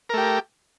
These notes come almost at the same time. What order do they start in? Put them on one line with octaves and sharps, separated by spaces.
A#4 A3 G4